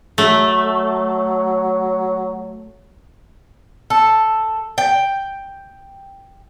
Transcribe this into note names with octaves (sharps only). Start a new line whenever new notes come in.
F#3 A3
A4
G5